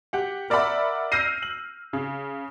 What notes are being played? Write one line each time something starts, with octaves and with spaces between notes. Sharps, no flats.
G4 F#5
A#4 D5 E5 F#5 B5
E6 F6 G6 A#6 C7 D#7
F#7
C#3